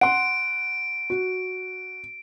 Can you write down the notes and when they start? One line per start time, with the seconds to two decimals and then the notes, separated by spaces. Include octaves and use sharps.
0.01 F#5 C6 D7
1.10 F#4